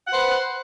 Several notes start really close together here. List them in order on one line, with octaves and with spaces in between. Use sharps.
F#5 C5 B4